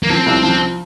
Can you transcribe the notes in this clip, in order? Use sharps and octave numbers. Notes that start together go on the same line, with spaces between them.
A#3
F3 C4
C2
F3